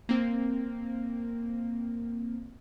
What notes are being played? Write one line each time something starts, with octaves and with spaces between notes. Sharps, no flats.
A#3 C4